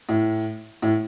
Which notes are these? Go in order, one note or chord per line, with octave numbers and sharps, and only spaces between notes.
A2
A2